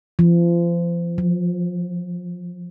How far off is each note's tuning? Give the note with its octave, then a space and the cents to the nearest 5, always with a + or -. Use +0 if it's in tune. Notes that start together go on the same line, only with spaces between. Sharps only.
F3 -35
F3 +25